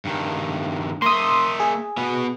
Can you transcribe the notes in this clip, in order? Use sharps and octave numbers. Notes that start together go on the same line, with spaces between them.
G2 D#3
A#3 E5 C6 D#6
G#4
B3 F#4